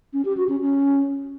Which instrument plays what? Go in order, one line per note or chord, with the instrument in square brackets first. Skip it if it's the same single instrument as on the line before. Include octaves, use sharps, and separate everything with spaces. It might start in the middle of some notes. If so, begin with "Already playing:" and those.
[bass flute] C#4
G4
F#4
C#4
C#4